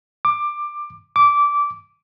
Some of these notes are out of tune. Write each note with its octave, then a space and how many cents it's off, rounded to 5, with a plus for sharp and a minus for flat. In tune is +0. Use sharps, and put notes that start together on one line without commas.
D6 +15
D6 -15